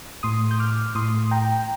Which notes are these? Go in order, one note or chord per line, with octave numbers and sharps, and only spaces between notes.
A2 C6 D#6
G6
D6 F6
A2 C6 D#6
G5 A#5